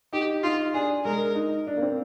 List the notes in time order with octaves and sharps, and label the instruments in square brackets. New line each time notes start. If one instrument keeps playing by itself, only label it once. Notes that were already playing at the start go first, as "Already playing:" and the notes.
[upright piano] D#4 [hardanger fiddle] G4
[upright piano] D#4 [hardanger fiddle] F4
[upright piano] D4 [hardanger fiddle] G#4
[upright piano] G#3 [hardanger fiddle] A#4
[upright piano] D#4
D4
A#3
C4